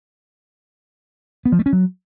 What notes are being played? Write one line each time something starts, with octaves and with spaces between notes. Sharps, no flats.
B3
F3
A3
C#4
F#3